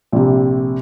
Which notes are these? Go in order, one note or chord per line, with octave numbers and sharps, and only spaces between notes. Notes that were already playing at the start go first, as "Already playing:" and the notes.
A#1 C3